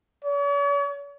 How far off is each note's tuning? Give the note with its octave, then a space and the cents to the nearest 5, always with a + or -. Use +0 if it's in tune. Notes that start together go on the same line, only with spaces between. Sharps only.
C#5 +45